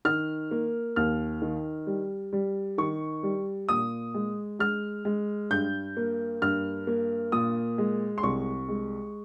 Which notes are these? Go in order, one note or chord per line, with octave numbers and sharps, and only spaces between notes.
D#3 F6
A#3
D#2 F6
D#3
G3
G3
D#3 C#6
G3
A#2 D#6
G#3
G#3 F6
G#3
G2 G6
A#3
G2 F6
A#3
A#2 D#6
G#3
C6
C2 C#6
G#3